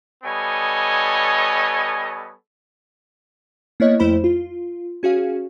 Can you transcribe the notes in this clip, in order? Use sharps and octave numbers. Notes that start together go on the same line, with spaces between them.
G3 B3 A4 C#5 D#5 G#5
A#3 B3 E4 C#5 D#5
F2 A3 E4 C5 B5 E7
F4
C#4 F#4 G#4 F5